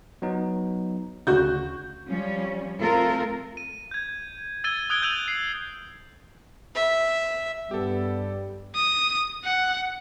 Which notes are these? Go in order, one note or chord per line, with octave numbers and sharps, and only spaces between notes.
F#3 B3 D#4
D2 C#3 F#4 G6
F3 G3 C#4
A3 C4 F4 A4 A#4
D#7
G6 G#6
E6 G#6 A6 D#7 G7
D#6 F#6 G#6 D7 D#7 G7
E6 G6 A6 D#7 F7 F#7
C7
E5
G2 G3 B3 G4 A4
D#6
F#5